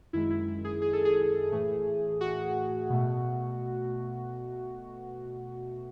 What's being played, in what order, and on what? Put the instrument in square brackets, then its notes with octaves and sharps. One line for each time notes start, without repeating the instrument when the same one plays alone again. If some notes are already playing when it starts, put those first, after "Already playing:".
[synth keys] F#2 D#3 G#3 E4
E4
E4
G#4
G#4
A4
G#4
A2 E3 A3
F#4
B2 A3